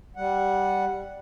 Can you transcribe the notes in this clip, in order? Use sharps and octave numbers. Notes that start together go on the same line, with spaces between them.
G3 F#5